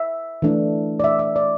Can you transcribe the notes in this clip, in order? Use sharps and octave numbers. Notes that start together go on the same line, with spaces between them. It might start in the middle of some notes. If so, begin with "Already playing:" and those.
Already playing: E5
E3 A3 D4
D5
E5
E5
D5